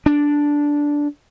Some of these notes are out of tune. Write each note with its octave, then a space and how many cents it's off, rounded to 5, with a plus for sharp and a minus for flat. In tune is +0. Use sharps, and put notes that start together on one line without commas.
D4 -5